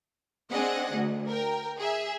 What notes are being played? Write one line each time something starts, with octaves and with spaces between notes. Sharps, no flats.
C4 D4 G#4 D#5 F#5
D2
A#4 G5
G#4 E5